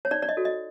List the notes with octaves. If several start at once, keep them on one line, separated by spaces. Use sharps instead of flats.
C#5
D#4 D5
D5
D#5
F#4 A4
D#5